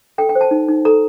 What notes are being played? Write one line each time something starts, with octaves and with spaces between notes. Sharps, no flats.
A4 G5
G5
C5
A5
D#4
D#4
A4 A#5